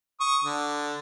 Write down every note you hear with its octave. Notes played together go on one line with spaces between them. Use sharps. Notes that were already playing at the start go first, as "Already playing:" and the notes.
C#6 D#6
D3